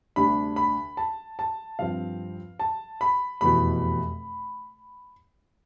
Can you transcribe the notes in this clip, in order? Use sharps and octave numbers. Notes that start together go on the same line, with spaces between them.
D2 C3 G3 D4 B5
B5
A5
A5
G2 F3 C4 F5
A5
B5
F1 E2 B2 B5